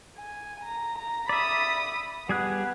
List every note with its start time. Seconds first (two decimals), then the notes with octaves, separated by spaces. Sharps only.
0.17 G#5
0.64 A#5
0.98 A#5
1.29 D5 E5 B5 D#6
2.29 G3 B3 G#4 F#6